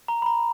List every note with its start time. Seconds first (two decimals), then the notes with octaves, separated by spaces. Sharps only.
0.08 A#5
0.22 B5
0.26 A#5